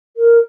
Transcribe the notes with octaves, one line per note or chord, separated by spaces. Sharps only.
A#4